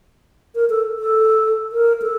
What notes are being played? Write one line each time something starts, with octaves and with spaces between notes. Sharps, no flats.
A#4
A4
A4
A#4
A4